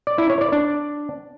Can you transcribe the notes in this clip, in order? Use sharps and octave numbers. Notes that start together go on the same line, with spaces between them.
D5
E4
C#5
D5
D4